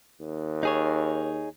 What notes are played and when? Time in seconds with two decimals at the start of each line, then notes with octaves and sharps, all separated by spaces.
0.21 D#2
0.63 D#4 G#4 C#5